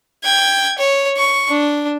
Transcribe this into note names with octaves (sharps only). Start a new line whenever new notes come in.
G5 G#6
C#5
C#6
D4